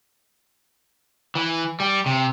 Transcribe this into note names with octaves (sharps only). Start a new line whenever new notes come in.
E3
G3
C3